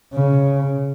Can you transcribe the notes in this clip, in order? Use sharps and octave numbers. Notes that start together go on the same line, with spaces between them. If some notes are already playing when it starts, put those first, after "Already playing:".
C#3